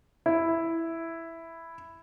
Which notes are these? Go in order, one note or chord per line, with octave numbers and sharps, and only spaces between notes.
E4